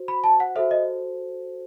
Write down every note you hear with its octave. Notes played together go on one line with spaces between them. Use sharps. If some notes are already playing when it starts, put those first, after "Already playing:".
Already playing: F#4 C5
B5
A5
F#5
F#4 A4 C5 E5
D#5